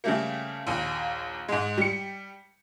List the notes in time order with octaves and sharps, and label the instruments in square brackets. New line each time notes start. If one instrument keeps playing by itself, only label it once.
[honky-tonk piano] C#3 G3 A3 A#3
A#1 D#2
G#2 G#3
G3 C#7